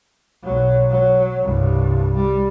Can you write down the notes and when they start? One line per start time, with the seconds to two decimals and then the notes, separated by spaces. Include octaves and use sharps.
0.44 B1 F#3
0.90 F#3
1.43 C2 G2
2.16 G3